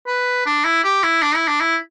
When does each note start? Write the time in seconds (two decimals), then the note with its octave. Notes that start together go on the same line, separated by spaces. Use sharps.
0.07 B4
0.46 D4
0.65 E4
0.84 G4
1.03 E4
1.22 D4
1.36 E4
1.48 D4
1.61 E4